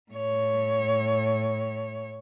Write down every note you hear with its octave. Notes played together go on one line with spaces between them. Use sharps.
A2 C#5